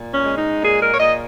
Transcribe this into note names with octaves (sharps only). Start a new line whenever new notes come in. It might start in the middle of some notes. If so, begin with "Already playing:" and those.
Already playing: A#2
C#4
G#3
D#4
A#2 G#4
A#4
C#5
A#2 D#5